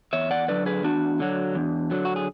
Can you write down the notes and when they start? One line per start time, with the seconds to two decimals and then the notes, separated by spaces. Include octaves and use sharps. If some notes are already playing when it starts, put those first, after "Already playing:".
0.13 E2 C#5 E5
0.31 D5 F#5
0.48 D3 F#3 B4 D5
0.66 G#4 B4
0.84 E2 D4 F#4
1.20 D3 F#3
1.55 E2
1.91 D3 F#3
2.05 F#4
2.16 G#4